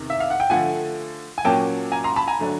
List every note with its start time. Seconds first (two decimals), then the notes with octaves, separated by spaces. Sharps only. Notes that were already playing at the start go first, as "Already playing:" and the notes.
Already playing: E2 C3 D#3
0.10 E5
0.20 F5
0.30 F#5
0.40 G5
0.50 D3 F3 A3 F#5 G#5
1.38 G#5
1.44 A#2 F#3 A#3 C#4 G5 A5
1.92 G#5 A#5
2.04 A#5 C6
2.16 A5 B5
2.27 G#5 A#5
2.39 D3 F#3 A3 D4